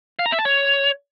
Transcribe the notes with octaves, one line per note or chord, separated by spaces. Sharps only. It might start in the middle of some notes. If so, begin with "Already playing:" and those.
F5
A#5
E5
A5
C#5